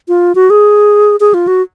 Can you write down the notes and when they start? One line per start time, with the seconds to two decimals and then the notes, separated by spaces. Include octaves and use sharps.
0.08 F4
0.35 F#4
0.50 G#4
1.20 G#4
1.34 F4
1.47 F#4